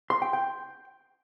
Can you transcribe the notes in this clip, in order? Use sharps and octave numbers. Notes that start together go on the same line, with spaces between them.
C6
G5
G5